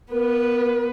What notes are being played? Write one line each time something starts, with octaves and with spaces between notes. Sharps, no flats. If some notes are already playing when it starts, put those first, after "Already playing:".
B3 A#4 B4